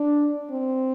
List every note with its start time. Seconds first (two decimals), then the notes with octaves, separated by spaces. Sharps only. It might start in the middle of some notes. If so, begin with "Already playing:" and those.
Already playing: D4
0.51 C4